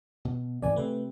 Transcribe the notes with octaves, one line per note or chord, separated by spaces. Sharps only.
B2
G#2 C3 E3 D5 G#5
C3 A3 C4 B4